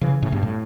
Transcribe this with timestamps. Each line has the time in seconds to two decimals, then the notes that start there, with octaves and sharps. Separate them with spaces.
0.01 C#3 E3
0.22 A2 C#3
0.32 G2 B2
0.43 A2